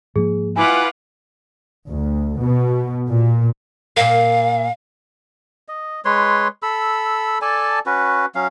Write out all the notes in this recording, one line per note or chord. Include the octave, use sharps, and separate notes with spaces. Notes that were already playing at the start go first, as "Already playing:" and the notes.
G#2 F3 A#3 G#4
E4 F4 B4 F#5 G#5 D6
D2
B2
A#2
A#2 A#3 F5
D#5
G#3 B4 C#5 C6
A4 B5 E6
A4 D5 G#5 A5
C#4 F#4 B4
F#3 C#4 F5